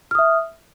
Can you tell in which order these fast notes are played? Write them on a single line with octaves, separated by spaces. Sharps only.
F6 D#6 E5